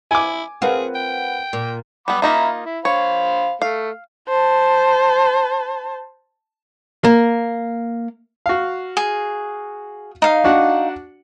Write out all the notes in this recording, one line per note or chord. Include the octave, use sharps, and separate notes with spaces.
E4 G#5 D6
C4 F4 G#4 A#4 B4 F#5
G5
A#2
G3 B3 F#5 B5 D6
A#3 D#4 F4 E5 A#5 B5
E4
C5 C#5 F5 B5
A3 F5
C5 A5
A#3
F#4 F5
G#4
D#4 F5
D4 F#4 F#5